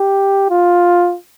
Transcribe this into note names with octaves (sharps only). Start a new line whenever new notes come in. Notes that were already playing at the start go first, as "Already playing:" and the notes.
Already playing: G4
F4